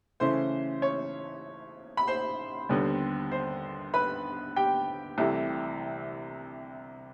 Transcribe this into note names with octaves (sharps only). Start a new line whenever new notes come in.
C#3 E3 A3 C#4 C5 C6
C#5 C#6
B5
C5 C6
D#2 D3 G3 B3
C5 C6
B4 B5
G4 G5
C2 C3 E3 A3